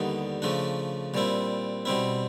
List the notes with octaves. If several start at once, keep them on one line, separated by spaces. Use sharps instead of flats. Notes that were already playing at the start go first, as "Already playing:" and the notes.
Already playing: D#2 D3 G3 B3 D#4
C#3 F3 A3 D4
A#2 G3 C4 E4
B2 G3 C4 E4